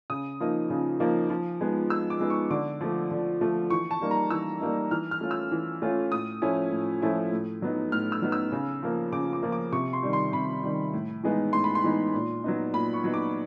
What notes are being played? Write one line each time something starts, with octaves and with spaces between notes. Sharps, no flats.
C#3 D#6
F3 A#3 D#4
C#3
F3 A#3 D#4
F3
G#3 B3 D#4
F3 E6
D6
G#3 B3 D#4
C#6
D3 D6
F3 A3
D3
F3 A3
E3 C#6
A5
G3 A#3 D#4
A#5
E3 E6
G3 A#3 D#4
E3 F6
F6
A3 C#4 F4
E6
E3
A3 C#4 F4
A2 D#6
F3 A3 C#4 E4
A2
F3 A3 C#4 E4
A2
F#3 B3 D#4
A2 F6
E6
F#3 B3 D#4
E6
C#3
F3 A#3
C#3 D6
D6
F3 A#3
D6
C3 C#6
C6
D#3 G3
C6
C3 B5
D#3 G3
A2
E3 G#3 B3 D#4
A2 C6
B5
C6
E3 G#3 B3 D#4
A#2
F#3 B3 D#4
A#2 B5
C#6
F#3 B3 D#4
D6